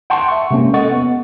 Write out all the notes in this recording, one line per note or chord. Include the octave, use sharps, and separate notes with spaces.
F#5 G5 A5 C6 C#6
E5 C#6
C3 G#3 A#3 C#4
A4 D#5 F#5 C#6 A6
B3